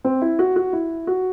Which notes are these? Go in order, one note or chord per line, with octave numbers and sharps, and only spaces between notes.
C4
E4
F#4
F#4
E4
F#4